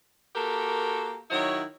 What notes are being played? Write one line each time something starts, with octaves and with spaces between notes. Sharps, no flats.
A#3 F#4 G4 A4 A#4
D#3 F#3 E4 C#5